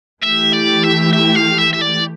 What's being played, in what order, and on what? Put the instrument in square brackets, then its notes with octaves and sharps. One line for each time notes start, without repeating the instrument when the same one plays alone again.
[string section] E3 A3 E4 G4 [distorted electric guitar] E5
[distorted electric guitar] D5
E5
E5
F5
E5
E5
D5